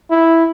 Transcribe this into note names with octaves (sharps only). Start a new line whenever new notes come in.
E4